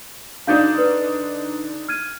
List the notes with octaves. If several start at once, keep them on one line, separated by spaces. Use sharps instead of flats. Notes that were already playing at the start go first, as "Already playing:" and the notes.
D3 D4 D#4 F5 G6
B4
F6 G#6 D#7